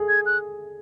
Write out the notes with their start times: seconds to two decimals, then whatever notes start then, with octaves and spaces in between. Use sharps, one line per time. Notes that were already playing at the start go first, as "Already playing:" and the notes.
Already playing: G#4 A4
0.09 G#6
0.26 F#6